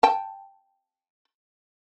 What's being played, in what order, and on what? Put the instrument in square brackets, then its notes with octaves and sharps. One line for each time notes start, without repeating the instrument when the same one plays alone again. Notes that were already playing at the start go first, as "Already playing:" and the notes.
[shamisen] G5 A5